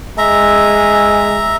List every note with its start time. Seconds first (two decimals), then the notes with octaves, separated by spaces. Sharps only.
0.18 G#3 E5 A#5